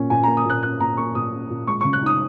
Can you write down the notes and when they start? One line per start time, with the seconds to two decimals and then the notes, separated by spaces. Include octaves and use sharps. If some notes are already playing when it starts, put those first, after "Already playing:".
Already playing: A#2 A#3 C#4
0.10 A#2 G#5
0.23 A#5
0.27 A#3
0.37 D#6
0.45 A#2 F#6
0.63 C#4 F#6
0.80 A#2 A#5
0.97 A#3 C#6
1.15 A#2 D#6
1.32 C#4
1.50 A#2
1.67 G#3 C#6
1.81 C#6
1.85 C#3
1.93 F#6
2.02 D#4 D#6